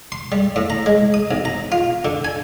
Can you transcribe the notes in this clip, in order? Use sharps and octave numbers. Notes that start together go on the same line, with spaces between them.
C6
G3
A2
A#5
G#3
D#6
B1
A#5
F4
D3
G#5